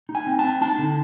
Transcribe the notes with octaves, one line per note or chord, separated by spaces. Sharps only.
D#4
G#5
C4
C4 A5
D#4 A5
D3